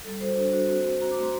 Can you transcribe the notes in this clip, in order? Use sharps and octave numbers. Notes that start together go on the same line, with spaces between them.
G3 A4
F#4 C5
D4
F#4
C4
F#4
F#4 A#5
D6
A3
C6